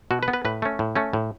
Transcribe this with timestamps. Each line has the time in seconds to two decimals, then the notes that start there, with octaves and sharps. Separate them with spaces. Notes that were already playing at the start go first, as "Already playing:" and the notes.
0.11 B2 F#4
0.23 B4
0.28 B3
0.33 B4
0.45 A2 B4
0.62 A3 C#4
0.79 A2
0.96 A3 C#4
1.13 A2